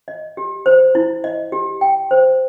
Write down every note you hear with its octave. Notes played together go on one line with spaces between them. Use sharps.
D#5
G4
C5
E4
D#5
G4
G5
C5